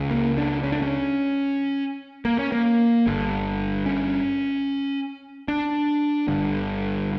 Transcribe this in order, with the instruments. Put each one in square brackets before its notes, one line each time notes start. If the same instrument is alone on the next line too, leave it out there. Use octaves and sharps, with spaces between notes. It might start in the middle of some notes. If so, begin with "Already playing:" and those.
Already playing: [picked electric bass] C#2 C#3
A#3
D4
C#4
D4
C#4
A#3
C#4
A#3
G1 G2 D3
C#4
D4
G1 G2 D3